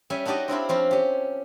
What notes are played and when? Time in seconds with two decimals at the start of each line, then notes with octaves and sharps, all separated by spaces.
0.10 G3 C#4 E5 G#5
0.25 D4 D#4 F#4 G4 D5 D#5
0.48 C4 D4 E4 F4
0.69 F3 C4 C#4
0.91 C#4 G4